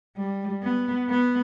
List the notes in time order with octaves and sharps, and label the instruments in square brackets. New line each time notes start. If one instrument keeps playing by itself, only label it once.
[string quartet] G3
B3
B3